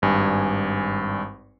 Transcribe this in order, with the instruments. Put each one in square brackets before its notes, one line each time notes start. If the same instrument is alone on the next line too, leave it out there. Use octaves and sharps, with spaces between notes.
[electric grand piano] G#1 G2 G#5